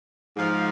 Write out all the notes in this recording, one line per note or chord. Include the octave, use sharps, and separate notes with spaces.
G#2 F3 F5